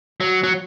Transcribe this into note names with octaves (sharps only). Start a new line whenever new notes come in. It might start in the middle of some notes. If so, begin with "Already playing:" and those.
F#3
F#3